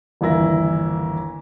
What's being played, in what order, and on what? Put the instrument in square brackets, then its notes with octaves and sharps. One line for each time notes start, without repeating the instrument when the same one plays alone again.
[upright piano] G1 D#2 E3 E4 A#6